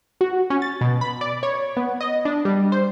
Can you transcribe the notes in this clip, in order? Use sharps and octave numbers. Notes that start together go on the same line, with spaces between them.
F#4
C#4
A6
B2
B5
D5
C#5
B3
D#5
D4
G3
C5